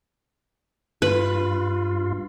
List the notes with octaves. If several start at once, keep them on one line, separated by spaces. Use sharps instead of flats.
G2 F4 B4